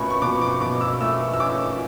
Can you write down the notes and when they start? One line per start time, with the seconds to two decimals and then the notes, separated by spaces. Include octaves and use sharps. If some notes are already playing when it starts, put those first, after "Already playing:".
Already playing: B2 A3 C#4 B5 C#6
0.10 C#6
0.22 B2 D6
0.41 D6
0.61 B2 D6
0.81 E6
1.01 A3 E6
1.33 E6
1.40 C#4 D6